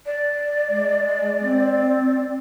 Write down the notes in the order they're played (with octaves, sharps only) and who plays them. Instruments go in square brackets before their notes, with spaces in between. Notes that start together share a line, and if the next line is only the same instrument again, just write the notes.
[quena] D5
[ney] G#3
C4